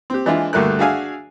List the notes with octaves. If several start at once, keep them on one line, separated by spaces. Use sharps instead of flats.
C4 G4
E3 G#3 D4 E4 F4
D2 G2 A3 A#3 A#4 F#6
D4 F#4 G#4 E5 F5 G#5